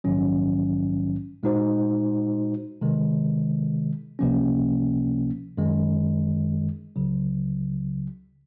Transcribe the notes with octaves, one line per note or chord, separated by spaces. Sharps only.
A#1 G#2 D#3 F#3 C#4
A#2 G#3 D#4 F#4 C5
C3 D#3 G#3
C#2 C3 F3 A#3 C#4
F#2 D#3 G#3
C#2 C#3 F#3